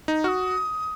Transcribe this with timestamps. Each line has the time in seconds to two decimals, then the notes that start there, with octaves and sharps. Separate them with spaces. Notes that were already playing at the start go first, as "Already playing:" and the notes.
0.08 D#4
0.24 F#4 D#6 F6